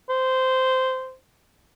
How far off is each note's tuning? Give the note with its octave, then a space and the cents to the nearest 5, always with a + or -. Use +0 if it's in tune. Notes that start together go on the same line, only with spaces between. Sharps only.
C5 -15